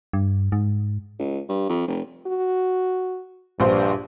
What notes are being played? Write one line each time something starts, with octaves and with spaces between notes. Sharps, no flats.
G2
G#2
C#2
G2
F2
F1
F#4
A#1 G2 C5